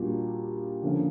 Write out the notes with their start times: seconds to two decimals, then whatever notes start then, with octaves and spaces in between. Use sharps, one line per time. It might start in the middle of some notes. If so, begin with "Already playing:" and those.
Already playing: A#2 G3 A#3 D4 F#4
0.82 D3 F3 A#3 C#4 F4